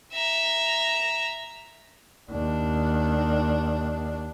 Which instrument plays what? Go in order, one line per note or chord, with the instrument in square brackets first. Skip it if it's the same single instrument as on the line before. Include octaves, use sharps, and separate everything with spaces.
[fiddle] E5 A#5
[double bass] D#2 D4